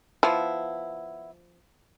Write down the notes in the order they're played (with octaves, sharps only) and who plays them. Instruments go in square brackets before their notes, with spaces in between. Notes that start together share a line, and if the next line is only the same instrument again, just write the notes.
[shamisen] F3 [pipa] B3 E4